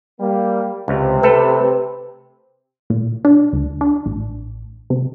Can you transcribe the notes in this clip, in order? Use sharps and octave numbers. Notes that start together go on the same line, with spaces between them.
G3 A#3
C#2 C3
A3 A4 B4
A#2
D4
D2
D4
A1
C3